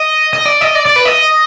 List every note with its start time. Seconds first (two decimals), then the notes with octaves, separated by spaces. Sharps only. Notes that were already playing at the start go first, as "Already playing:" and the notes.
Already playing: D#5
0.33 D#5
0.45 D5
0.61 D#5
0.75 D5
0.86 D5
0.96 B4
1.05 D#5